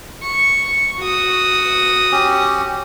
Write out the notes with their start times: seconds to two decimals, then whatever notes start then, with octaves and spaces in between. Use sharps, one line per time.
0.23 C#6
1.00 F#4 D#6
2.12 C#4 G4